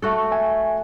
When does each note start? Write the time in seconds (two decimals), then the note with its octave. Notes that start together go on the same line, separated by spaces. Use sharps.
0.02 A3 F#4 A4
0.32 E5 G#5